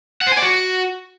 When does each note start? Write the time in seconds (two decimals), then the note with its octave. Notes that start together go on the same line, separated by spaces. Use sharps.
0.21 F#5
0.27 C5
0.32 G#5
0.37 D5
0.42 F#4